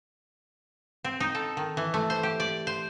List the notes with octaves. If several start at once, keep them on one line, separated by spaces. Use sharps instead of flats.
C4
D#4
A4
D#3
E3
A3
C5
G4
D5
C5